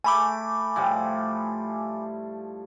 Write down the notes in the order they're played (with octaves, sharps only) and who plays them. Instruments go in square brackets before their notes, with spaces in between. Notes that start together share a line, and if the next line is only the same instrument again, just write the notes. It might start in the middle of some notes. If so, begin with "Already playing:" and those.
[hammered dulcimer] A3 [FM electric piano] G#5 B5 D6
[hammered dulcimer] A2 F3 G3